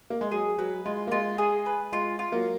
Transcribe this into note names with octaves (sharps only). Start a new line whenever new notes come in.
A#3
G#3
F#3 G#4
F#3 B4
G#3 F4
A#3
G#3 F4
G#4
B4
G#3 F4
F4
F#3 A#3